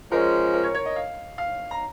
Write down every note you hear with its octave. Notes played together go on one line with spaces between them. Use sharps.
F3 G#3 C#4 A#4
A#4
C#5
C#5
D#5
F5
F5
A#5